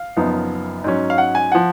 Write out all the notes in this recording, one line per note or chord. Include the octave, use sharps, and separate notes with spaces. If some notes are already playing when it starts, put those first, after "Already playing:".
Already playing: F5
F#1 F#2 F3 B3 D#4
G#2 F#3 C#4
F5
F#5
G#5
F3 F#5